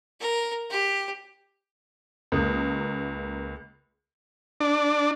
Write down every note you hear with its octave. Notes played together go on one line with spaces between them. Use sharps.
A#4
G4
C#2 A#3 D#6
D4